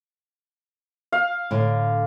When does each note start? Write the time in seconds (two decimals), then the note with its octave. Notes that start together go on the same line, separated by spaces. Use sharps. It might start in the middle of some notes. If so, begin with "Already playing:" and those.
1.12 F5
1.51 A2 D3